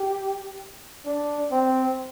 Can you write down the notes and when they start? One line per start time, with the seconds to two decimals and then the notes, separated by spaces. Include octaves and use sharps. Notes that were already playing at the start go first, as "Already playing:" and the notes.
Already playing: G4
1.06 D4
1.51 C4